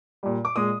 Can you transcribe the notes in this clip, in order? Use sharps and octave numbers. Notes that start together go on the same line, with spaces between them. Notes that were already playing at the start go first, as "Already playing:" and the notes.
A#2 G3
D6
A#2 G#3 D#6